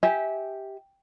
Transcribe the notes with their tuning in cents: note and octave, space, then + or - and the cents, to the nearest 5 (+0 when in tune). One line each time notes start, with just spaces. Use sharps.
G4 +0 E5 -25 G#5 +0